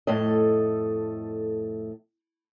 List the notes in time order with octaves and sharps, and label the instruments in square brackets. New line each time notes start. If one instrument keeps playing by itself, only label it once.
[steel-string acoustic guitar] F2 A2 A3 A4 D#5